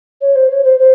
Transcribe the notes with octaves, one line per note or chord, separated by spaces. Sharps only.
C#5
C5
C#5
C5
C5